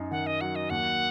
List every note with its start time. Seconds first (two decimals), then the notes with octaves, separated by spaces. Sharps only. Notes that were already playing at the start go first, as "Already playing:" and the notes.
Already playing: F#2 D#4
0.11 D#3 F#5
0.27 D#5
0.41 F#3 F#5
0.56 D#5
0.70 D#2 F#5